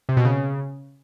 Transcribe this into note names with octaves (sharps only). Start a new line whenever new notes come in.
C3
B2
C#3